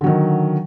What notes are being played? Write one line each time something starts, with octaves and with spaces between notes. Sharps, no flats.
D3 D#3 F#3